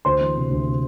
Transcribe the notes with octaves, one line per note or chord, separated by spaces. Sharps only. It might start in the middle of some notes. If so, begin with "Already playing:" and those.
D2 C5 C6
E3
C3
D2
C3